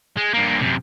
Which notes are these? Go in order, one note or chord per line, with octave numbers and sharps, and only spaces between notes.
G#3
G2 A#3
F#2 C3